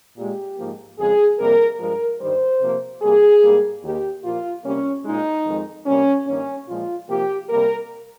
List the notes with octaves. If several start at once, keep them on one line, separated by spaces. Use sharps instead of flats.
A#2 G#3 G4
G#2 F3 A#3
F2 C#3 G#3 G#4
F2 C3 G3 A#3 A#4
G2 F3 G#3 A#4
G2 D#3 G3 C5
C3 F3 A#3
C3 G3 A#3 G#4
G#2 G3 A#3
D#2 D#3 A#3 G4
A#2 F3 A#3 F4
C3 G3 A#3 C#4
A#2 G#3 D#4
F2 D#3 G#3
C3 G3 A#3 C#4
G2 D#3 A#3 C#4
A#2 F3 G#3 F4
C3 F3 A#3 G4
C3 G3 A#3 A#4